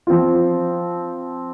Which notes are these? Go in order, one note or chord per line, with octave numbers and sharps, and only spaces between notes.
F3 C4 F4